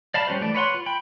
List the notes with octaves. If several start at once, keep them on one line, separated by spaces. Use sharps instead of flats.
D5 F5 A5 B5
G3 C#4 F#4 C5
E3 A3 D5
B4 C#5 F#5 C6
F4
G5 B5